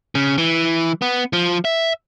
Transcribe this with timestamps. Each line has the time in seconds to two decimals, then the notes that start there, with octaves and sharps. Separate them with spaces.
0.15 C#3
0.38 E3
1.02 B3
1.33 F3
1.65 E5